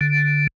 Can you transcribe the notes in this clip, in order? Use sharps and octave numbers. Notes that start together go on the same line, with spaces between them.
D3